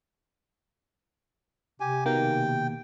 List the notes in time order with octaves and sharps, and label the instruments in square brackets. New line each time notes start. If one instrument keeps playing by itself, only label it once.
[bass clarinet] C3 [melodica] G4 G#5
[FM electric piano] B2 D#3 A#3 [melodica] G5